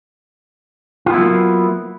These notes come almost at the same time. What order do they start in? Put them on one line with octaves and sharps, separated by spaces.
F4 B3 E4 F#3 A#3